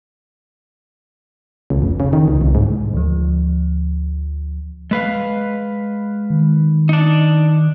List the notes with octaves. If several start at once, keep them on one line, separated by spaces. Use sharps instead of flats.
C#2
F1
C#3
D#3
C#2
C2
G#2
D2 F3
G#3 B4 F5
D#3
D4 D#4